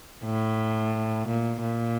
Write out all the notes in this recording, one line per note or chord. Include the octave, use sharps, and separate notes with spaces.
A2
A#2
A#2